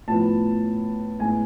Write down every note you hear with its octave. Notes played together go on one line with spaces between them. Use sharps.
A2 F3 B3 A5
A2 G#3 B3 G#5